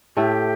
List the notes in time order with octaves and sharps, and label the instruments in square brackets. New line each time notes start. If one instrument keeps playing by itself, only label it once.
[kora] A2 A3 [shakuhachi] G4